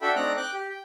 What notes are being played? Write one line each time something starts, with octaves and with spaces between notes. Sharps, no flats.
D4 F#4 A4 E5 G5 B5
A3 C4 D4 D#4 A#5 F#6
G5 D6 F#6
G4
G5